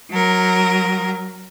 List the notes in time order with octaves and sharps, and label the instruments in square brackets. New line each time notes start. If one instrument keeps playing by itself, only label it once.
[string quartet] F#3 A#4